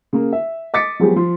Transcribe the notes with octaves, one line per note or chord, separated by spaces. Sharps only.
C#3 A#3
E5
D#5 D6 A6 B6 C#7
F3 F#3 G#3 B3 G4 G#4
F3 C6